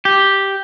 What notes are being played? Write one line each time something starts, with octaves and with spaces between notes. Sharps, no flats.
G4